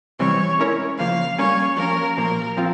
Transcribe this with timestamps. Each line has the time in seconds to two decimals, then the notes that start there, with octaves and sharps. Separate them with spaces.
0.20 C3 E3 G3 C4 C#5
0.59 G#3 C#4 E4 A#4 C#5
0.99 C#3 F3 A#3 F5
1.38 G3 A#3 C#4 C#5
1.77 F3 A#3 C#4 A#4
2.17 A#2 F3 A#3 A#4
2.57 F3 C4 F4